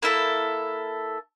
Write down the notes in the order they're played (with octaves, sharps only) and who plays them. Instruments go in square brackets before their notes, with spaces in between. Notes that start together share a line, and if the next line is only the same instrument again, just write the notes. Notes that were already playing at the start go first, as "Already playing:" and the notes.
[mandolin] A#3 E4 A4 E5